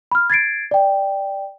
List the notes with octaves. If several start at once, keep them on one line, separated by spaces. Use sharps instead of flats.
B5 F6
G#6 A6 C7 D7
D5 G5